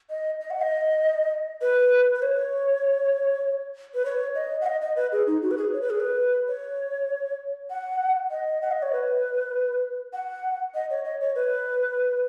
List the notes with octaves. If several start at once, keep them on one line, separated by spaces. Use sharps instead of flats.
D#5
D#5
F#5
D#5
B4
B4
C#5
B4
C#5
D#5
F#5
D#5
D#5
B4
G#4
D#4
F#4
B4
G#4
C#5
B4
G#4
B4
C#5
F#5
D#5
F#5
D#5
C#5
B4
F#5
D#5
C#5
D#5
C#5
B4